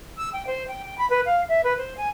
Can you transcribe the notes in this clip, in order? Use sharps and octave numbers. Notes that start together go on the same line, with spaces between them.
E6
G5
C5
G5
G5
B5
B4
F5
E5
B4
C5
G#5